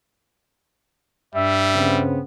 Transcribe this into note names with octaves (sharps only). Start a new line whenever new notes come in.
G2 G3 E5
C#3 B3 C4